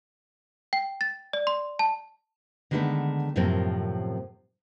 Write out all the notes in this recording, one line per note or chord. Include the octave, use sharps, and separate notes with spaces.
G5
A6
D5
C6
A5
D3 D#3 G#3 A3 B3 D#4
F#2 A2 C3 F3 A#3 C4